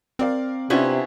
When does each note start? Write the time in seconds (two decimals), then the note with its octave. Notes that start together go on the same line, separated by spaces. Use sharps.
0.19 C4 A#4 D5 F5
0.70 C3 B3 C#4 D4 E4 F4 C5